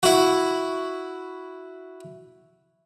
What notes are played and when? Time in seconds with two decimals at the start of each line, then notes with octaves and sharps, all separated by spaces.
0.03 E4 F#4